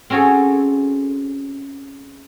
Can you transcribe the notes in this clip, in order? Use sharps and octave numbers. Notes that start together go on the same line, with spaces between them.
C4 C#4 F#4 G#4 A4